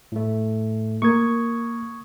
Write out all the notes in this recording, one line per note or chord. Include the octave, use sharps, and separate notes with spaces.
A2 A3
A#3 C#6 D#6 G#6